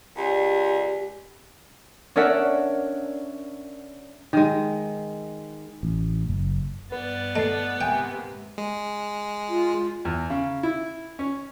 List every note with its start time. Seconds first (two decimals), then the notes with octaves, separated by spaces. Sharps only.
0.17 C#2 G4 D5
2.16 C#4 D4 A#4 D5 E5 F#5
4.33 D#3 G#3
5.83 A1
6.28 F#1
6.92 G2 B3 B4 D5 A6
7.36 A3 D#5 A5 C7
7.81 G#2 C3 A#3 E5 G5 G#5
8.58 G#3
9.49 F4
10.05 E2
10.30 C#3
10.63 E4
11.19 C#4